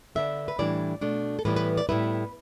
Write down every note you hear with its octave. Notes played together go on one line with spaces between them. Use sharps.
D3 B3 D4 E5
B4
A2 E3 G3 D4 D5
B2 A3 D4
A4
A2 E3 G3 B3 B4
B4
D5
A2 G3 B3 E4 B4